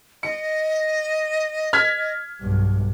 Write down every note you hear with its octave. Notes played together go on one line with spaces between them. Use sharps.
D#5 C#7
F6 G#6 B6
B1 G2